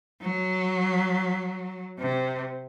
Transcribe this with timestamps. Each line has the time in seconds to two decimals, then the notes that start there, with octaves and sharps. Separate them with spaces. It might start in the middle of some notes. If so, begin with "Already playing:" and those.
0.21 F#3
1.99 C3